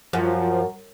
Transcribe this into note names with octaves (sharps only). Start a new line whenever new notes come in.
F#2 F3